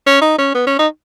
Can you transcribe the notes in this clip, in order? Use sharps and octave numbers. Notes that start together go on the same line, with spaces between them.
C#4
D#4
C#4
B3
C#4
D#4